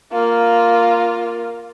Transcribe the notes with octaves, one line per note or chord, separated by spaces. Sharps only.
A#3 F4